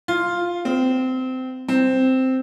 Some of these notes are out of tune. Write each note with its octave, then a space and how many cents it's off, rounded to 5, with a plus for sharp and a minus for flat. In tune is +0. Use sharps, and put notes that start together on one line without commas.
F4 +0
C4 -20
C4 -5